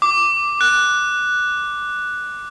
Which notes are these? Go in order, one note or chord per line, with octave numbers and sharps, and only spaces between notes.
D6
F#6